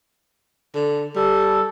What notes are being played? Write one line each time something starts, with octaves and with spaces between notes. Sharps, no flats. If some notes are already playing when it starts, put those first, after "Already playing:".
D3
G3 A4